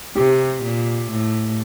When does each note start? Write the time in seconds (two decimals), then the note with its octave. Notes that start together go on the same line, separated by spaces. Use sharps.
0.16 C3 G4
0.63 A#2
1.10 A2